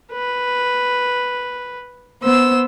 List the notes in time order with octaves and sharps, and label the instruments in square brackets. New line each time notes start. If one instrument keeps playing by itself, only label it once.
[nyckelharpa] B4
[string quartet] B3 C5 E6